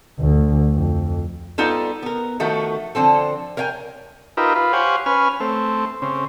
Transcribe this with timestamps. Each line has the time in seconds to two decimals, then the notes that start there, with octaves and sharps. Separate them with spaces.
0.19 D2
0.75 F2
1.58 G3 B3 D#4 F4 A4
2.03 B3 A#4
2.40 D#3 F3 A3 F#4
2.95 D3 F3 C4 A4
3.57 A#4 C#5 F5 G5 G#5
4.37 D#4 F4 G4 A#4 B4 E5
4.56 F4 B4
4.73 G4 C5 C#5 F5 F#5 G#5
5.06 C#4 B4 G#5 F6
5.40 A3 C4
6.02 C#3 C4